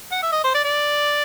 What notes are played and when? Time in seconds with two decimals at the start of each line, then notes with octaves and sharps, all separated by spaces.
0.12 F#5
0.23 E5
0.32 D#5
0.44 C5
0.55 D5
0.65 D5